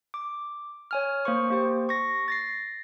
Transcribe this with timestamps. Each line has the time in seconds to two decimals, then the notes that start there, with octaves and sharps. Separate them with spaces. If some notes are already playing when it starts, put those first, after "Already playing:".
0.14 D6
0.91 C#5 G#5 F6
1.25 A#3 C5 C#6
1.50 A#3 G4 C5
1.89 C#6 A#6
2.28 A6 A#6 C7